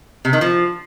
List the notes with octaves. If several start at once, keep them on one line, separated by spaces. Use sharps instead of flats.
C3
D#3
F3